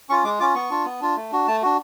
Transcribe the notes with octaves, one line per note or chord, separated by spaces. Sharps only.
C#4 F4 C#6
G#3 D6
C#4 F4 D6
B3 C#6
D4 F4
B3
D4 F4
A3
D4 F#4
A3 A5
D4 F#4